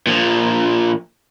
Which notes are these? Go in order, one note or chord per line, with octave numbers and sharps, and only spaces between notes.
A#2 F3